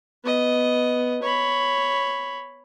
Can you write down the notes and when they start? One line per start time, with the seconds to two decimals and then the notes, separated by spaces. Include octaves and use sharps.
0.24 B3 D#5
1.22 C#5 B5